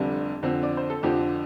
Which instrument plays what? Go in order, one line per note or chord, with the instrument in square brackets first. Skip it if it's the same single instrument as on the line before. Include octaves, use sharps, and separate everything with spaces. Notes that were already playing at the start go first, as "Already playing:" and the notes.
Already playing: [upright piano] F1 F2 D3 G3 D4
F2 D3 F3 C4
D5
C5
A4
F2 D3 F3 C4 G4